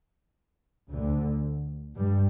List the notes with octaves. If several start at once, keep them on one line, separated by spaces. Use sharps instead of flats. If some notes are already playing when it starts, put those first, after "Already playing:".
D2 D3
G2 G3